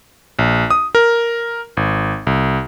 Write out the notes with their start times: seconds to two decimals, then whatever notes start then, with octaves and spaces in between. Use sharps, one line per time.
0.39 A#1
0.71 D#6
0.95 A#4
1.77 G#1
2.27 C2